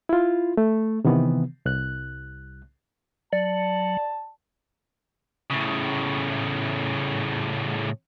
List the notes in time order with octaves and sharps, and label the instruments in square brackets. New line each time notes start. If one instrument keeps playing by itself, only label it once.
[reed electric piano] E4 F4
A3
C3 D#3 E3 B3
C2 F#6
[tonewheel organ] F#3 [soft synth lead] D5 [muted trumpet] A5
[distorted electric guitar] A2 C#3